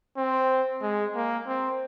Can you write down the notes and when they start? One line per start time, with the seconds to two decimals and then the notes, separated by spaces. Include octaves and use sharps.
0.17 C4
0.82 G#3
1.15 A#3
1.47 C4